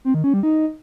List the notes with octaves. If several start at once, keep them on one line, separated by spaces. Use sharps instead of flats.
C4
D#3
C#4
G3
D#4